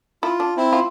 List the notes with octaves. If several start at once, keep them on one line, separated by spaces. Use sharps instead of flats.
E4 F4
D4
C4 E4
F4